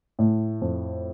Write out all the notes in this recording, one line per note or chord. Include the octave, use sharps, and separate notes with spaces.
A2
F2